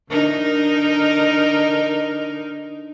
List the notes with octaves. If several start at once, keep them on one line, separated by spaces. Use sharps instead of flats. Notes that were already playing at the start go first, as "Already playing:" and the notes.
D3 D#4 A#4